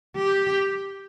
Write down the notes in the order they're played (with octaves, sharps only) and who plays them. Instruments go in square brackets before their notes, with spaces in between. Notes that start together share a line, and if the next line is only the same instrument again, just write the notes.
[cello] G4